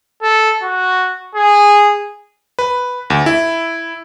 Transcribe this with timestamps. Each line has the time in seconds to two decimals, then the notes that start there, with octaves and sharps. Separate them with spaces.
0.22 A4
0.63 F#4
1.35 G#4
2.59 B4
3.10 D2
3.26 E4